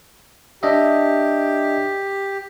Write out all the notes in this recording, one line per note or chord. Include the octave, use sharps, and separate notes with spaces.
D4 G4 D#5 E5